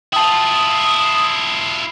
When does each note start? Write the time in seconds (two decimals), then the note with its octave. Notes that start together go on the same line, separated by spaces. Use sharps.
0.13 E4 F4 G5 A5 D#6